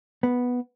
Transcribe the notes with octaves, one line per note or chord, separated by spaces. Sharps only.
B3